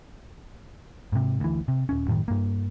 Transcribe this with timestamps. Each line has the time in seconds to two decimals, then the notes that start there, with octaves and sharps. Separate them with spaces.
1.12 G#2 C3
1.40 D2 E3
1.68 C3
1.89 D#1 C#4
2.08 F#2 A2 D3 D#3
2.28 G2 A#3